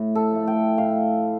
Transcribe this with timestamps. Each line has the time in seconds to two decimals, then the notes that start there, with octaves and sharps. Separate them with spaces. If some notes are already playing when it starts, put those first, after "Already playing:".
Already playing: A2
0.15 A4
0.31 F3 A3
0.47 G5
0.78 A2 F5